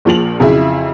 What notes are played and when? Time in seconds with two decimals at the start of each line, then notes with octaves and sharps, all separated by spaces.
0.05 A#1 A#2 F3 G#4 F7 F#7
0.40 F2 C#3 F#3 E4 G#4 E5